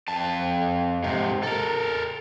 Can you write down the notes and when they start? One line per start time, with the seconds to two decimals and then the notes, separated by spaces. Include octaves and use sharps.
0.08 F2 A5
1.04 G#2 C3
1.43 A4 A#4